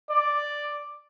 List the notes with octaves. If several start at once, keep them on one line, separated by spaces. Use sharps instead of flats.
D5